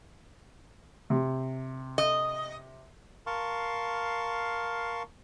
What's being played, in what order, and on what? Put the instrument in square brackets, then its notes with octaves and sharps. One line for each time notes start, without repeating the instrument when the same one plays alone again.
[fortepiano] C3
[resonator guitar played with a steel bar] D#5
[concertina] A#4 F5 A5 C6 C#6